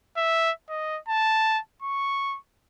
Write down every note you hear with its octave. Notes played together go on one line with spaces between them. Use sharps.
E5
D#5
A5
C#6